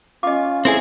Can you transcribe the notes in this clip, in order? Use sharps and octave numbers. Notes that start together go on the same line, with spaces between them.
C#4 F4 D#5 D6
C#2 C4 E4 G#4 A4